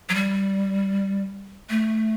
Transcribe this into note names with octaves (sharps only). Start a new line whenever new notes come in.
F#3
G3
A3